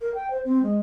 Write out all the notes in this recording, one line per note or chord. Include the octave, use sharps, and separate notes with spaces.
A#4
G5
C5
C4
G#3